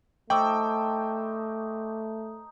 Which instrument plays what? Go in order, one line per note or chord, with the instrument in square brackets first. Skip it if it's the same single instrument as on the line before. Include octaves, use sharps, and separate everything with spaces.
[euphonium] A3 [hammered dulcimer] D#4 C5 A5 [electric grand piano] G5 [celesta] C#6 D6 E6